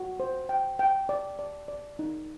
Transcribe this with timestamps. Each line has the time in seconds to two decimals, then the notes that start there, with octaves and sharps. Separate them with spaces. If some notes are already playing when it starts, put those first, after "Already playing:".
Already playing: F#4
0.20 C5
0.49 G5
0.79 G5
1.09 D5
1.39 D5
1.68 D5
1.99 D#4